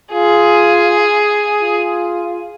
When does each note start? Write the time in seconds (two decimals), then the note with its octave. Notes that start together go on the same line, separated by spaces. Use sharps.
0.13 F4 G#4
1.60 F4